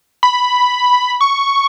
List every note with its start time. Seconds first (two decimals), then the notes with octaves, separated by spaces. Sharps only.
0.23 B5
1.21 C#6